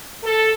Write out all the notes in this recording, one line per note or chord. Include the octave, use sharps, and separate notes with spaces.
A4